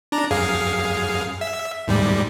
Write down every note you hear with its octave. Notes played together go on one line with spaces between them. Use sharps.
D4 A#5
F#2 G#4 F5
E5
D#2 G#2 G3